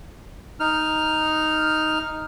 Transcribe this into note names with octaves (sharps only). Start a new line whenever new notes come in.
D#4 F6